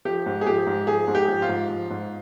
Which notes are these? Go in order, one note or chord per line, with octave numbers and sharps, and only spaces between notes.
F3 G4
G#2
G#4
F3 G4
G#2
F3 G#4
G#2
G4
F3
F4
G#2
F3
G#2